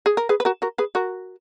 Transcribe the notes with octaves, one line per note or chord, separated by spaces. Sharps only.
G#4
A#4
G#4 B4
B4
F#4 A#4
F#4 A#4
G#4 B4
F#4 A#4